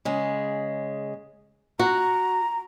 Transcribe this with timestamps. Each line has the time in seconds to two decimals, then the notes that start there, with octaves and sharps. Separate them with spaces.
0.05 C#3 G#3
1.79 F#4 A#5